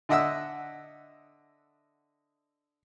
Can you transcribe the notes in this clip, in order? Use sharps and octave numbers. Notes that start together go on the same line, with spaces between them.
D3 D#5 E5 F#5 D#6 E6